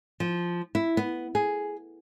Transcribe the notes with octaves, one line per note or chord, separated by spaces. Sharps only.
F3
E4
B3
G#4